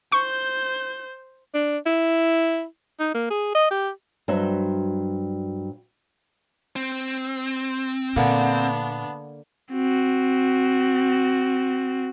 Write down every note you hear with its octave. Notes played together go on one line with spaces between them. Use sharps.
C5 C#6 G6
D4
E4
D#4
A#3
G#4
D#5
G4
G2 F#3 F#4 C5 E5
C4
A#2 D3 A#3 B3 D4
C4 F#4